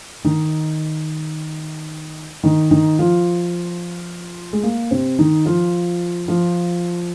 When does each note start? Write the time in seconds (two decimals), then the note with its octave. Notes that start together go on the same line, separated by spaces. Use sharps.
0.24 D#3 D#4
2.43 D#3 D#4
2.71 D#3 D#4
2.99 F3 F4
4.53 G#3
4.63 A#3
4.91 C3 C4
5.19 D#3 D#4
5.46 F3 F4
6.28 F3 F4